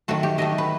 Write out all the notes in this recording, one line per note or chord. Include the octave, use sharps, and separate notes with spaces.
D#3 F#3 A3 F#4
G4
D#3 F#3 A3 D#5
B4